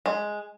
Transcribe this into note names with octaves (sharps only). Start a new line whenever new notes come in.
G#3